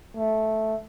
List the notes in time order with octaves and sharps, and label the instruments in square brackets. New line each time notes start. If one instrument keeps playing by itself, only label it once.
[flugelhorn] A3